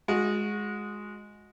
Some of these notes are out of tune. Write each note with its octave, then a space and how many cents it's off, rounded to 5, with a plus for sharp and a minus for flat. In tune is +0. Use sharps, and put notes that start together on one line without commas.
G#3 +0 F#4 -25